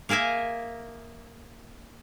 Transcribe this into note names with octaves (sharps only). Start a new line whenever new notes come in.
A#3 G#4 A#4 E5 G#5